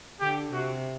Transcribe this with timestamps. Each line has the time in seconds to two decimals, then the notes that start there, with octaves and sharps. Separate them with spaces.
0.21 D3 G4
0.52 C3 F#4